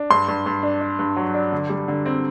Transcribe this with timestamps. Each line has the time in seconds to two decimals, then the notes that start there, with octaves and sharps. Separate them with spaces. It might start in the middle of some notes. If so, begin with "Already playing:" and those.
Already playing: D4
0.10 G2 C6
0.28 G2
0.46 G2
0.63 D4
0.81 D4
0.99 G2
1.16 F#3
1.34 D4
1.52 D3
1.70 G3
1.88 D3
2.06 C4